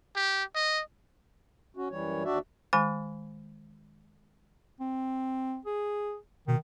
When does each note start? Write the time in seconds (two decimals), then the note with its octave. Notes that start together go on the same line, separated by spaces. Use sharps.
0.16 G4
0.55 D#5
1.77 C#4 F#4
1.90 F#2 E3 G3 C#5
2.24 D#2 D4 F#4 D5 E5
2.73 D#3 G#3 G#5 B5
4.81 C4
5.65 G#4
6.48 B2 D#3